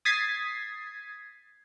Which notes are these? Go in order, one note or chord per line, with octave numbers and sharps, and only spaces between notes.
D#6 G#6 A6 B6 C7